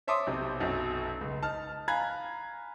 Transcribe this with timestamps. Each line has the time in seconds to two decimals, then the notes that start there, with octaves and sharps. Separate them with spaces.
0.07 C#5 E5 A5 C6 D6 D#6
0.27 B1 C3
0.60 B1 F#2 F#4
1.21 C#2
1.42 D#4 A5 F6
1.88 F5 G#5 A#5 B5 F#6 G#6